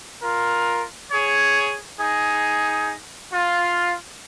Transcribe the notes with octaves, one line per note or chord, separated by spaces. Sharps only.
F4 A#4
G#4 C#5
D#4 G#4
F4